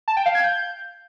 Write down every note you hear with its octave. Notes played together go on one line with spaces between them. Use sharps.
A5
G5
F5
G#6
G6